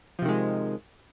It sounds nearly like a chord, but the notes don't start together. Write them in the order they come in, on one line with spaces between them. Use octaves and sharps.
F3 C3 D#3 G#3